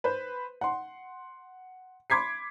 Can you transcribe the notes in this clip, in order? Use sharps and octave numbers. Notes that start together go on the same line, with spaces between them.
B4 C5
F#5 C6
B5 C6 D6 G#6 B6 C7